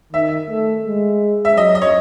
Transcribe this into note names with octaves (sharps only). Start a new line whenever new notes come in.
D#3 E5
A3
G#3
E5
F#3 D#5
D#5
C#5